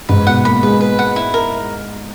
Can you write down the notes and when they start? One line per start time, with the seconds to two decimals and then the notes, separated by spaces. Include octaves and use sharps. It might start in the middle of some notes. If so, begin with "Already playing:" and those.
0.09 G#2 B4
0.27 B2 F#5
0.45 A#3 B5
0.63 G#3 B4
0.81 B4
0.99 F#5
1.16 E4
1.34 A#4